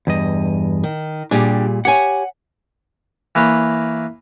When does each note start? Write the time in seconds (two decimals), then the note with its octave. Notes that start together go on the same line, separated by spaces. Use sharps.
0.07 E2 G2 D#5
0.83 D#3
1.31 A#2 G3 D4 G4 G#4
1.85 G4 C#5 F#5 G#5
3.35 E3 A#3 B4 C#5